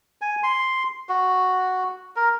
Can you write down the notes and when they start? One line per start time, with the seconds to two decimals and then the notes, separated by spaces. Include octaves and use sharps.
0.21 G#5
0.43 C6
1.09 F#4
2.16 A#4